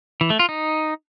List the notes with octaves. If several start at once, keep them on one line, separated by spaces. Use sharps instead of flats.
E3
A3
F4
D#4